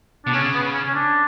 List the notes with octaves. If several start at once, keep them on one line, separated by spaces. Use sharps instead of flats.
B2 D4
C#3 C#4
B3
C#4
C#4
D4